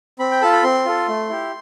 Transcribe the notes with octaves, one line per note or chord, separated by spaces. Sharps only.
C4 B5
G5
F4 A4 A5
B5
C4 C6
F4 A4
A3
E4 G4